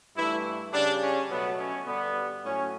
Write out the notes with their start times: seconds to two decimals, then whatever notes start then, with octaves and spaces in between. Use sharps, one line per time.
0.16 G2 E3 A3 E4
0.73 C#3 G3 D4
1.01 C#4
1.30 B2 F#3 A3 B3
1.59 C#4
1.87 G2 D3 G3 B3
2.44 A2 F#3 C#4